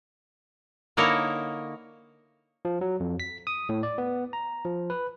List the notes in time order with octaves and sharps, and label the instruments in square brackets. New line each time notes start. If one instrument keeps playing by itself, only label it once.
[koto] D3 A#3 D#4 E4 A#4 C#5
[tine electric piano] F3
F#3
F2
B6
D#6
A2
D5
B3
A#5
F3
B4